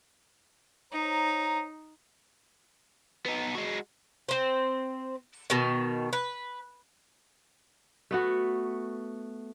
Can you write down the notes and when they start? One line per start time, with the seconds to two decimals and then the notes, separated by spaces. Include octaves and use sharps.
0.92 D#4 C5 C#5 A#5
3.26 B3 D#4
3.55 G#3 F#4
4.29 C4 C5
5.50 B2 D#3
6.13 B4
8.11 A3 B3 F#4